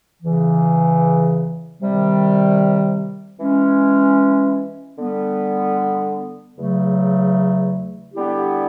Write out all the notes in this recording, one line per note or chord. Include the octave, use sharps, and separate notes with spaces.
E2 C#3 E3
C3 D#3 G3
E3 G#3 C#4
D3 G3 B3
E2 C#3 F#3 A3
D3 G3 B3 E4 G4